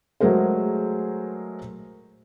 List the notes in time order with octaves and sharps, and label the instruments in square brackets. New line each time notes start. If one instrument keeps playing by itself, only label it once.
[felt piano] F#3 G#3 A3 G#4 A#4 C5